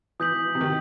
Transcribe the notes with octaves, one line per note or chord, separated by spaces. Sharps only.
E3 D#6 G6 B6 F#7
E3
E3
C3
D#3